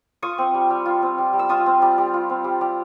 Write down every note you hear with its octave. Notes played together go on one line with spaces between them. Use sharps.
F4 C#6 D#6
C4
G3
G3
F4
C4
G3
G3
E6
F4 C#6 D#6
C4
G3
G3
F4
C4
G3
G3